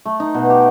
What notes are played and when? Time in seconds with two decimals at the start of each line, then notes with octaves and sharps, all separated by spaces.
0.05 A3
0.20 D#4
0.34 B2
0.50 G4